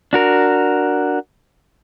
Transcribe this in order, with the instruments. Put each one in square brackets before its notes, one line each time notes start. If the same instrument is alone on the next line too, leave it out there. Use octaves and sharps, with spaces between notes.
[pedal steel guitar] D4 F#4 A#4